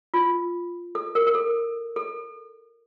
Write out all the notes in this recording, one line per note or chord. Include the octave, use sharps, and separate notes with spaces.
F4
A4
A#4
A#4
A4
A4